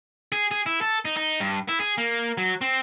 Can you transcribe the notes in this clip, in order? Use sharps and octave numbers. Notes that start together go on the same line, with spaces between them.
G#4
G#4
E4
A4
D#4
D#4
G2
E4
G#4
A#3
F#3
C4